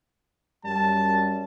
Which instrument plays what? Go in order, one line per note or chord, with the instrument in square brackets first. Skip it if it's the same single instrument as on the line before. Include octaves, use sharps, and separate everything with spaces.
[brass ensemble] F#2 G3 [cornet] A5